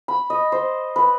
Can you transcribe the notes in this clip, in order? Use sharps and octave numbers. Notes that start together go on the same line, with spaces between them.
B5
D#5
C5
B4